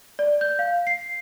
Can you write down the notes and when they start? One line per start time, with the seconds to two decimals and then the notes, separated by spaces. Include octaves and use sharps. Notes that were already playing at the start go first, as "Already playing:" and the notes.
0.19 D5
0.41 G6
0.59 F5
0.87 C7